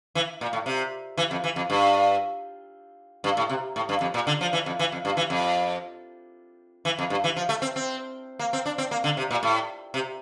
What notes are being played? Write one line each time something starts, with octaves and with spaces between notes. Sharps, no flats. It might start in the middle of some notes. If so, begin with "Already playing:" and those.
E3
A#2
A2
C3
E3
F2
E3
F2
G2
G2
A2
C3
A2
G2
F2
A#2
D3
F3
E3
F2
E3
F2
G2
E3
F2
E3
F2
G2
E3
F3
A3
C4
C4
A#3
C4
D4
C4
A#3
D3
C3
A#2
A2
C3